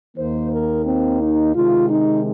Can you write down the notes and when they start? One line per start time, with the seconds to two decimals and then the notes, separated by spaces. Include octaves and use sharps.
0.17 D#2 D#3 A#3 C5
0.52 A#4
0.86 C4
1.20 D#4
1.55 C3 D#3 G#3 F4
1.90 D#4